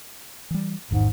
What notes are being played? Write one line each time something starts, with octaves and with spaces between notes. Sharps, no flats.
E3 G3
A1 E2 G#2 D#3